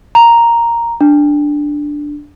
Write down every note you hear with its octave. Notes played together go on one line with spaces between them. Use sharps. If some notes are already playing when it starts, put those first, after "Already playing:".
A#5
D4